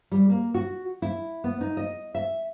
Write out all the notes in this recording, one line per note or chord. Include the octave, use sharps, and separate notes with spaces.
G3
A#3
F#4
E4
B3
D#4
D#5
E5